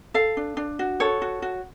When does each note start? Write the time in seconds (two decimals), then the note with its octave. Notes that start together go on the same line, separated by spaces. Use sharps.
0.14 A4 F5
0.37 D4
0.57 D4
0.79 F#4
1.00 A4 C#5
1.22 F#4
1.42 F#4